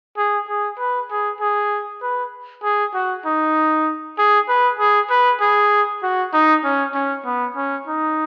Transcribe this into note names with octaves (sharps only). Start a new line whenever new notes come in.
G#4
G#4
B4
G#4
G#4
B4
G#4
F#4
D#4
G#4
B4
G#4
B4
G#4
F#4
D#4
C#4
C#4
B3
C#4
D#4